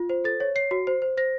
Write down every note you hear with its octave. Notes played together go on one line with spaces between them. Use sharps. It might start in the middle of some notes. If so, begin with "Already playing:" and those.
Already playing: F4
C5
A4 A6
C#5
C#5 C7
F#4
C5
C5
C5 A#6